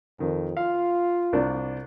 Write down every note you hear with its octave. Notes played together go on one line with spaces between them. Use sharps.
F2 D#3
F4 F5
C2 D4 D5